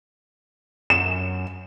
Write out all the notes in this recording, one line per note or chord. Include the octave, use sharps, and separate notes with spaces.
F#2 E7